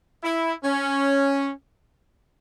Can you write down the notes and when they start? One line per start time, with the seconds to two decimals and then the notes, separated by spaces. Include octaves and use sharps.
0.23 E4
0.64 C#4